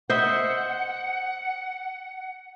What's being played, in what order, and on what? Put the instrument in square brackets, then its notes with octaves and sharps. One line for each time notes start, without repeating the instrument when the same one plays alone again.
[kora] C5 D#5 E5 [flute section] F#5